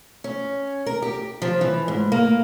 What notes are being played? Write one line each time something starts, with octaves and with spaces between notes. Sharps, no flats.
C#4
A#4
G4
F3
E3
G#2
A#3